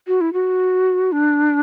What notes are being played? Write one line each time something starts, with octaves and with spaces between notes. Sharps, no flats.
F#4
E4
F#4
D4